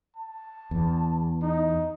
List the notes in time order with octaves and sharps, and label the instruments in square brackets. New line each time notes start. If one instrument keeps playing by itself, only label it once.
[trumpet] A5
[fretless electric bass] E2
[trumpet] D#4